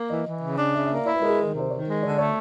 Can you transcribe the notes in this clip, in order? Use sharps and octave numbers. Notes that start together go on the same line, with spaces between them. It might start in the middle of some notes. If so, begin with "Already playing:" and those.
Already playing: A#3
E3 D#5
E3
C#3
D4
C#3 E5
E5
A#3 D5
E4 C#5
B4
G#3 A#4
G#4
D#3 A#4
C3
C5
D#3 C#5
G#3
D3 C#5
D5
A3 C#5